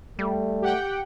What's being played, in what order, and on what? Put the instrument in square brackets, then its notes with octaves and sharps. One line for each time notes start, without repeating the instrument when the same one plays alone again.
[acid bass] G3 [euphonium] A3
[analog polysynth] G4 F#5 G5